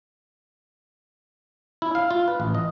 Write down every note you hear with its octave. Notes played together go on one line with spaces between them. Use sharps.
E4
F5
F4
B4
A1
D#5